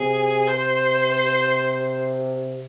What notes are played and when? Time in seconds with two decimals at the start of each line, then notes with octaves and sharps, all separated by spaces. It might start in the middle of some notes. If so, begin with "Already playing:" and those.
Already playing: C3 G#4
0.47 C5